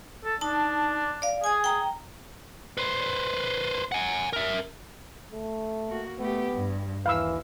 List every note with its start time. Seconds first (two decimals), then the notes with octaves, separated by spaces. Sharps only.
0.25 A4
0.41 D4 D#4 A5
1.22 D5 F5
1.44 G#4 G#5 D#6
1.64 G5 A#5
2.78 B4 C5
3.92 F#5 G#5
4.33 A#4 E5
5.33 A3
5.88 A#3 F#4
6.19 A3 B3 G4
6.54 G2
7.06 D#2 E3 F5 B5 E6